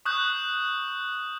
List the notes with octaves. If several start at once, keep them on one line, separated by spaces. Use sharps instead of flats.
C#6 D#6 F#6 G6